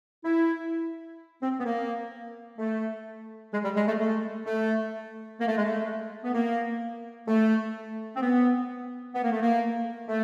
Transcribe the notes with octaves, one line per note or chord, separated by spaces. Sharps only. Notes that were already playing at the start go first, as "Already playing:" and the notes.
E4
C4
B3
A#3
A3
G#3
G3
G#3
A3
A3
A3
A#3
A3
G#3
A3
B3
A#3
A3
C4
B3
B3
A#3
A3
A#3
A3